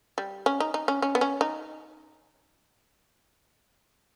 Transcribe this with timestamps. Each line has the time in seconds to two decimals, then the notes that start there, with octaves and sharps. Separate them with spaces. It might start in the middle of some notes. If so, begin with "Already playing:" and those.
0.18 G3
0.46 C#4
0.60 D#4
0.74 D#4
0.88 C#4
1.02 C#4
1.15 B3
1.21 C#4
1.41 D#4